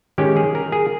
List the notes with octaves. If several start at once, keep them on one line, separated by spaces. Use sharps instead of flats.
D#3 G#3 C#4 G4
G#4
A#4
G#4